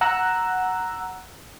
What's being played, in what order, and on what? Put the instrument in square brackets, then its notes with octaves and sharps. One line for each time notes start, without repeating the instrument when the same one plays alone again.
[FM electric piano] F#5 A#5 E6 F#6